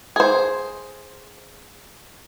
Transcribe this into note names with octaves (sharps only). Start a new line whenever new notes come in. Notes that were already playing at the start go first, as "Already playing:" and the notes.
G#4 C5